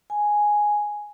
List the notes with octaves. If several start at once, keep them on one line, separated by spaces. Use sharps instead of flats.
G#5